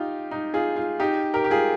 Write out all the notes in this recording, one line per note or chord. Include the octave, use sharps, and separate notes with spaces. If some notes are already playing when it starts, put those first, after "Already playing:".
Already playing: D#4 F4 G4
D#4
F4 G#4
F4
D#4 G4
G4 A#4
G4
F4 G#4